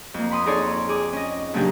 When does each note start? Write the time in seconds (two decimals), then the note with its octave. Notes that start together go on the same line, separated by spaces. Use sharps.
0.14 F2 A#3
0.31 B5 C6 D#6
0.46 D#4 G#4 A4 C#5 D5 C6
0.89 G#4 D6
1.13 C#4 D#5
1.54 A#2 C#3 F#3 D4 D#4 G4